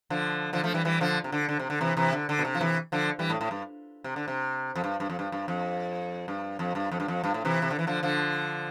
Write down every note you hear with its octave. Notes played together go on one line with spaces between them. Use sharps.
D3 F3
D3 F3
F3 A3
E3 G3
E3 G3
D3 F3
C3
D3
D3
C3
D3
C3 E3
C3 E3
D3
D3
B2
C3
F3
C3 E3
D3 F3
E3 G3
A2
A2
G2
C3
D3
C3
F2
G2
G2
F2
G2
G2
F2
G2
F2
G2
F2
G2
F2
G2
A2
C3 E3
C3
D3
E3
D3 F3
D3 F3